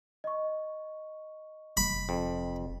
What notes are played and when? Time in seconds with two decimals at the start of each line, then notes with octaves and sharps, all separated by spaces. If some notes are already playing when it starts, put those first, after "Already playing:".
0.24 D#5 C#6
1.77 F1 B5
2.09 F2